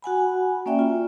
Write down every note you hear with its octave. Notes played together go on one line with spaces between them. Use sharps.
F#4 F#5 G#5 B5
A#3 C#4 D5 E5 G5
F4